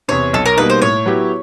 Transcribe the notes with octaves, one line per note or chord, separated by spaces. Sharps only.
E2 C3 C#5
B1 A4
A#4
B2 G3 A#3 D#4 B4
C5
A2 C#5
F#3 B3 E4 G4